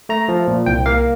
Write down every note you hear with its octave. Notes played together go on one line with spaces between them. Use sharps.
A3 A#5
F3
A#2
C2 G5
A#3 F5